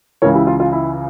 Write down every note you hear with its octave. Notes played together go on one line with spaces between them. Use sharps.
C#2 C#3 E3 A#4 C#5
E4 G4
F4
F4
E4